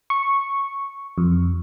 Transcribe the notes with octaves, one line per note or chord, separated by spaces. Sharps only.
C#6
F2